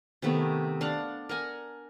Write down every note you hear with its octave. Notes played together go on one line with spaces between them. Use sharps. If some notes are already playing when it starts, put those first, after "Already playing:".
C3 D#3 A3 B3
D4 F5 F#5
A#4 F#5 G#5